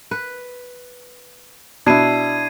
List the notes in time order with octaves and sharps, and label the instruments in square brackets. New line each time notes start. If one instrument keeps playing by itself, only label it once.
[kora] B4
[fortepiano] B2 [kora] D4 E4 [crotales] G#6 C7 D#7